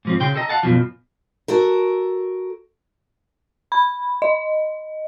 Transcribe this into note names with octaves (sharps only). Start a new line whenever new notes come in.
G#2 F3 C4
C#3 G5 C6
A4 D#5 A#5
F5 F#5 A5
F#2 B2 F3
F#4 A4 A#4
B5
D#5